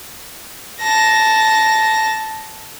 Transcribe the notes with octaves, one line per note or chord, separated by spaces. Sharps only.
A5 A#6